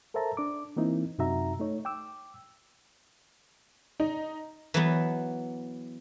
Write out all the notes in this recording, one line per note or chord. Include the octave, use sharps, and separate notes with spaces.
A4 A#4 C5 E5 A5 A#5
D4 D6
E3 A#3 C4 D#4 E4
F#2 C3 D#4 F#4 E5 A#5
A3 D#4 C#5
G5 D6 E6
D#4
E3 F#3 B3